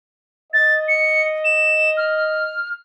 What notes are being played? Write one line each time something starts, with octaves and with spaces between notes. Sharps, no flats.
D#5 A6
C#7
E7
F6